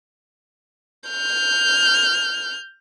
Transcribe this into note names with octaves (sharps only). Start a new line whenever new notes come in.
F6 G6